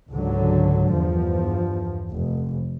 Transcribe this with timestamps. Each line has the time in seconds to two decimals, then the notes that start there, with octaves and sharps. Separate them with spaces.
0.10 C#2 G#2 D3 F#3
0.94 E2 G2 F3
2.14 F1